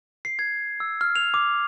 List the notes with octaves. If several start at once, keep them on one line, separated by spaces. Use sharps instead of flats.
C7
G#6
E6
F6
F7
D6